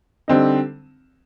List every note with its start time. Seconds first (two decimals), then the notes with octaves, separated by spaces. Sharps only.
0.28 D3 G3 C4 D#4